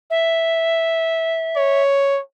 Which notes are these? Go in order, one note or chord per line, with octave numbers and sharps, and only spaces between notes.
E5
C#5